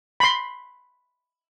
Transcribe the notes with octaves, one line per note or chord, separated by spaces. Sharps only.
B5 C6